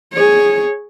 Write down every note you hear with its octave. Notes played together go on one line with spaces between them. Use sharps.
G#4 C#5